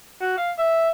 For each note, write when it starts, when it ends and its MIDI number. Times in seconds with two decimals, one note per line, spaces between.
0.21 0.35 66
0.37 0.51 77
0.58 0.90 76